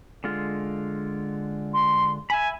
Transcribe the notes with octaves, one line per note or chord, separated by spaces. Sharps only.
D3 G#3 F4
C6
E5 G#5 B5